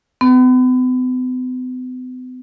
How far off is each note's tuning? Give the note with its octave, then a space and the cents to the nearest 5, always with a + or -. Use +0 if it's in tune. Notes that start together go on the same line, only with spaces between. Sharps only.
B3 +45